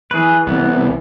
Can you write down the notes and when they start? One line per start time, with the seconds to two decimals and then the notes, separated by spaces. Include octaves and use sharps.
0.11 E3 G#4 B4
0.47 C2 E3 B3